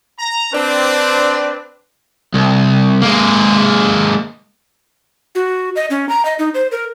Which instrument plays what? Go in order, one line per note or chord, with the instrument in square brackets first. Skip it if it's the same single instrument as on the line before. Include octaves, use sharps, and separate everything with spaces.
[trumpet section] A#5
[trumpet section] C4 D4 [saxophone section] B4 C5 D5
[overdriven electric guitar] C2
G#3 A#3
[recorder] F#4
D#5
C#4
A#5
D#5
D#4
C5
A#4